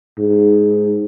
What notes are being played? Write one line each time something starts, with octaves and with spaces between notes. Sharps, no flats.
G#2